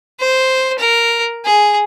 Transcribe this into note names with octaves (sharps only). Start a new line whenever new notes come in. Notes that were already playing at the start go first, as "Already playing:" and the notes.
C5
A#4
G#4